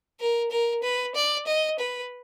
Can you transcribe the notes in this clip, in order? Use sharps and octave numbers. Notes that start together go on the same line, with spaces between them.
A#4
A#4
B4
D5
D#5
B4